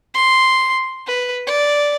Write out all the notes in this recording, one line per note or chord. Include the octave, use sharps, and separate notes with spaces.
C6
B4
D5